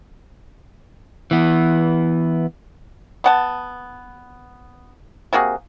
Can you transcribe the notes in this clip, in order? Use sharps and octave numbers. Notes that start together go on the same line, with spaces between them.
E3 B3
B3 F#5 A5
C3 A#3 F#4 G#4